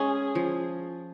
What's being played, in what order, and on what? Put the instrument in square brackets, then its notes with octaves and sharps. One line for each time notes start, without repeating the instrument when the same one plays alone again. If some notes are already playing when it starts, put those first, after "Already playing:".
Already playing: [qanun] G#3 C#4 [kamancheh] G#4
[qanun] F3